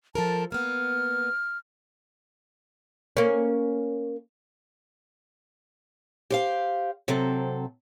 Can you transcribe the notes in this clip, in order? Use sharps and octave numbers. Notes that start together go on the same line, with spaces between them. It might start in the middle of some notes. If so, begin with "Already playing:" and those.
F3 A4 A#4 A5
A#3 B3 F6
A#3 C#4
G4 C5 F5
C3 F#3 C4 A4